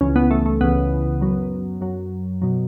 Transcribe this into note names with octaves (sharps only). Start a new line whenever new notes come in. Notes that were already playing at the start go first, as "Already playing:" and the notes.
C#2 C#3 E3 C#4
B3
A3
A3
C#2 C#3 E3 B3
F#2 F#3
F#2 F#3
B2 F#3